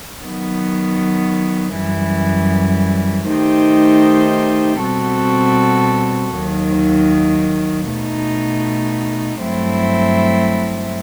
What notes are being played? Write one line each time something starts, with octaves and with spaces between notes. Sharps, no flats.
D#3 F#3 B3
F#2 E3 G3
D#3 A3 D#4 G4 C5
B2 G3 C4 F#4 A4
D#2 D#3 F#3
B2 A3 D#4
G2 F#3 A3 C4 E4